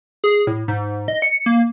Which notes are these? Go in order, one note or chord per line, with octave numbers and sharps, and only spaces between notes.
G#4
A2
G#2
D#5
C#7
A#3